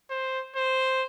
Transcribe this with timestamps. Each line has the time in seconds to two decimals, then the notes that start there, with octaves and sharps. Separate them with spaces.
0.10 C5
0.56 C5